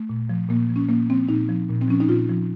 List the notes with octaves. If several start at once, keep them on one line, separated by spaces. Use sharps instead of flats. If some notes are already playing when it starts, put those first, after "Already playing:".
Already playing: A3
A#2
F3
A#2 A#3
F3
C#4
A#2 A#3
F3 C4
A#2 D#4
F3
A#2
C4
F3 C#4
D#4
A#2 F4
F3